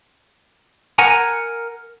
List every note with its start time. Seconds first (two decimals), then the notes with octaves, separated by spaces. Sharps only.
0.99 A#4 F#5 G#5 A#5